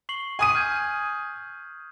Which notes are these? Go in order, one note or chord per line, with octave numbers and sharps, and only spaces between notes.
C#6 C7 F#7
G#5 D#6 D#7
F6 G6 G#6